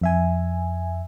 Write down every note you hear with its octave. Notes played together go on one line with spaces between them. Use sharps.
F2 E5 G#5